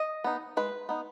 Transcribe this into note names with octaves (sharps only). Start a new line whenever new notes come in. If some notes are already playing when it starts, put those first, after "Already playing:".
Already playing: D#5
B3 D#4
G#3 B4
B3 D#4